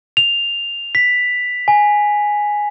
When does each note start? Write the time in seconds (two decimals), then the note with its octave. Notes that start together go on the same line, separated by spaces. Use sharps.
0.17 F7
0.95 B6
1.68 G#5